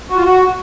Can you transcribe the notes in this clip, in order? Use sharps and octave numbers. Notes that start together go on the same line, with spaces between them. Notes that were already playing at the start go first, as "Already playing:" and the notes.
F#4
F4
F#4